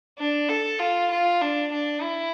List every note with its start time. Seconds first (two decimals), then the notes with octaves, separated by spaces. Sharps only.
0.19 D4
0.49 A4
0.79 F4
1.11 F4
1.41 D4
1.72 D4
2.02 E4